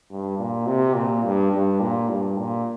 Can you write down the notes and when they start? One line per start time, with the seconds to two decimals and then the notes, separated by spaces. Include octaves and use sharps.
0.11 G2
0.39 A#2
0.67 C3
0.95 A#2
1.25 G2
1.53 G2
1.80 A#2
2.09 G2
2.37 A#2